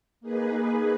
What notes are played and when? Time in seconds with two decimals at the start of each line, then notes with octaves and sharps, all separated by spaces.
0.21 A#3 D#4 G#4 B4